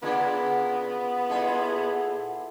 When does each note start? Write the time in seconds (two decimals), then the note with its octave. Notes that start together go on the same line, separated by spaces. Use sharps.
0.02 C#3 A#3 B3 D4 F4 G#4 F#5 B5
1.29 A#2 C#4 E4 G#4 A4 C6